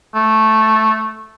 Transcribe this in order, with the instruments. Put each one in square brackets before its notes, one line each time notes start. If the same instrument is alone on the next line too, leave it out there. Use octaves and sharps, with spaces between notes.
[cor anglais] A3